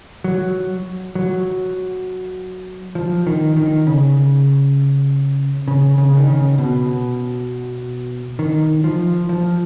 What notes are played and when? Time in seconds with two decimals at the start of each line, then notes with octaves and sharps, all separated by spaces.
0.24 F#3
1.15 F#3
2.95 F3
3.27 D#3
3.56 D#3
3.87 C#3
5.68 C#3
5.98 C#3
6.17 D#3
6.27 C#3
6.58 B2
8.39 D#3
8.84 F3
9.29 F3